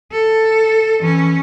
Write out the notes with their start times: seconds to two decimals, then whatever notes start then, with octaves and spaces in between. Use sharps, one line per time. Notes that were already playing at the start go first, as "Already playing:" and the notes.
0.12 A4
1.02 E3 C#4